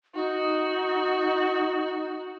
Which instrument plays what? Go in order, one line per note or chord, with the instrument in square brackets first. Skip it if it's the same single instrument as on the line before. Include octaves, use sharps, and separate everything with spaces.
[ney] D#4 [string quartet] F#4